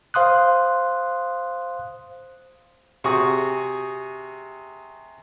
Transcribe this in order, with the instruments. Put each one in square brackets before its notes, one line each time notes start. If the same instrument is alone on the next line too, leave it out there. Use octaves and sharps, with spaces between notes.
[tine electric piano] C5 F5 C6 D#6 F#6
[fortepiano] C3 F#4 G#4 C#6